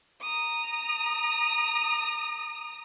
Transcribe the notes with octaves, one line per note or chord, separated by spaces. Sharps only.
A#5 D#6